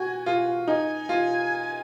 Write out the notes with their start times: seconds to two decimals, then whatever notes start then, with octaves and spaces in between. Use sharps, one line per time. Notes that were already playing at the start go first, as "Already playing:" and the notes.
Already playing: F#4 G#5
0.26 F4
0.68 D#4 G#5
1.09 F4